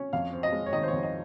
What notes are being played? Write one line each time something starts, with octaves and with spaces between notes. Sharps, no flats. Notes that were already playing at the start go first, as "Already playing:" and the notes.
Already playing: C#4
F2 F5
C4
D#5
G#3
C#5
D#3 D#5
C5
C#5
F2
D#5